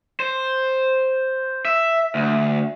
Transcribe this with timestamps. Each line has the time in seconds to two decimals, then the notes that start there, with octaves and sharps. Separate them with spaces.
0.20 C5
1.65 E5
2.15 D2